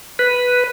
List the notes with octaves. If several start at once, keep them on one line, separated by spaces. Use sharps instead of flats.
B4